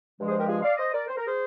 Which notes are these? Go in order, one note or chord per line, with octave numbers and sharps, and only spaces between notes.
G2 F3 G#3
G#4 C5
G4 A#4
F4 G#4
D5 F5
C5 D#5
A#4 D5
C5
A#4
G#4 C5